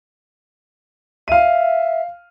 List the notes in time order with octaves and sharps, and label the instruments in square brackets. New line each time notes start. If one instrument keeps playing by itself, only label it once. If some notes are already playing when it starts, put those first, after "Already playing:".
[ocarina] E5 [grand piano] F5 D#7